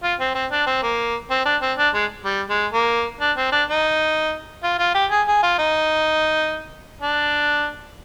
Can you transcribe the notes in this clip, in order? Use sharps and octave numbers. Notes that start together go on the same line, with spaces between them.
F4
C4
C4
D4
C4
A#3
C4
D4
C4
D4
G#3
G3
G#3
A#3
D4
C4
D4
D#4
F4
F4
G4
G#4
G#4
F4
D#4
D4